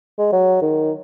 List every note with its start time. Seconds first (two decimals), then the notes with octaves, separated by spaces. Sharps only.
0.18 G#3
0.33 F#3
0.61 D#3